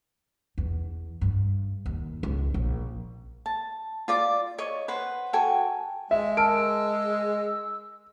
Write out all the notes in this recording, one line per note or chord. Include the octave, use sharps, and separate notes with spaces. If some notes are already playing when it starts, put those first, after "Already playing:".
E2
G2
D#2
C#2
A#1
A5
F4 D5 D6
C#5 D#5 C#6
B4 C5 F#5
F#4 A4 G5 G#5
G#3 E5
A#4 A5 E6 F6 D7